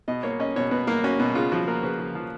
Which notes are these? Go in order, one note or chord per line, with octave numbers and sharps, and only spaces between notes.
B2 D#5
A#3 C#5
C#4 D#5
B2 C#5
B2 B4
A#3 A#4
C#4 F#4
B2
C#3 F4
F3 F#4
A#3 A#4
C#3 B4
C#3
F3